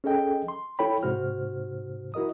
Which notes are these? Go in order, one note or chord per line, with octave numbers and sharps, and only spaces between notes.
C#4 G#4 A4 D#5 G5
C6
E4 A4 C#5 G5 B5
G#2 C3 F#4 C5 F6
E4 F#4 A#4 D#5 D#6